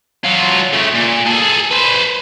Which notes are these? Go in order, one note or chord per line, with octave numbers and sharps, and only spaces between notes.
F#3 F4
C#3 A3
A#2
G#4 A4
B4 C5